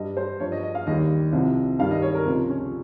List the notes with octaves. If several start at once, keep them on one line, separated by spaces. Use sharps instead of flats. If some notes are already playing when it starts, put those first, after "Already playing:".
Already playing: G2 G3 D#5
C5
G2 F3 C#5
D#5
D#5
F5
D#2 D#3 G3 D#5
C2 C3 F3
G2 D#3 G3 F5
D#5
C#5
A#4
C#2 C3 F3 C4
C#4